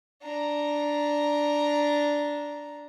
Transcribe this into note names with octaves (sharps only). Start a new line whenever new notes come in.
D4 A#5